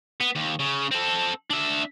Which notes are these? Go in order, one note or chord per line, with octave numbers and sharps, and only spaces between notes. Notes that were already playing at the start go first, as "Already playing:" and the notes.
B3
D#2
C#3
C4 A4
D4 E5